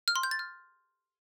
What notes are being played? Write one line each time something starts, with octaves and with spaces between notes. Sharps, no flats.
F6
C6
G6
A6
F6